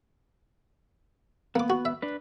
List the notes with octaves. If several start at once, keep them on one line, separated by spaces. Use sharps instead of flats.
A#3 B3 D6
F#4
E5
D4 B4